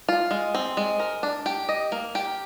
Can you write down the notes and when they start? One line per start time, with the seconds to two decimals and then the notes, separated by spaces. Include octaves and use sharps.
0.09 F4
0.31 G#3
0.55 C4
0.77 G#3
1.00 A#4
1.23 D4
1.46 G4
1.69 D#5
1.92 A#3
2.15 G4